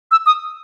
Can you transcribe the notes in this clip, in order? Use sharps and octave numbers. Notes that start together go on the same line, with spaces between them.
E6
D#6